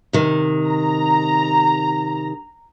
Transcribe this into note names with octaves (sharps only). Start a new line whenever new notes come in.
C3 D#3
A#5